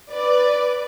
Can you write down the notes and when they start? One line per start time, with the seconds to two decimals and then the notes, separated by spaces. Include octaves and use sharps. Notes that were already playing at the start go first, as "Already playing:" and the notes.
0.11 B4 D5